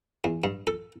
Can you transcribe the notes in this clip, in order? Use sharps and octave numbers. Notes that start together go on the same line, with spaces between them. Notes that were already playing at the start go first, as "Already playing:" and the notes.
E2
G2
A4